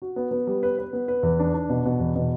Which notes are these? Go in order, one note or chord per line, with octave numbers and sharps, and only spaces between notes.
F#4
B3
B3
G3
B4
B4
B3
B4
E2
D4
D4
B2
B2
E2
B2